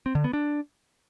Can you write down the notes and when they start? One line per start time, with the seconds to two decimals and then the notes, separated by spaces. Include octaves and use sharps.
0.06 C4
0.15 D3
0.24 B3
0.33 D4